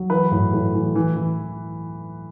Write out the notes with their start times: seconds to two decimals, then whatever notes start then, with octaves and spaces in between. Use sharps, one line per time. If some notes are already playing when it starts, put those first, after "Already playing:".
Already playing: F#3
0.10 E3 B4
0.31 A2
0.53 A2
0.74 E3
0.95 E3
1.17 E3